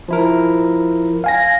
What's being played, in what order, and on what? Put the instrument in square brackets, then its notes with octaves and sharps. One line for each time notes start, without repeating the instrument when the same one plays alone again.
[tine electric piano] F3 E4 A#4
[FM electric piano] F5 G#5 A#6